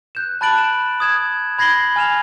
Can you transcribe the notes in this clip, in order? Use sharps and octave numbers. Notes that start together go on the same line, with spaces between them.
F#6 G6 E7
A5 B5 F#6 A6 D7 F#7
E7
D#6 G#6 E7
B5 G#6 A#6 C7 F#7 G7
G#5 F6 E7 F7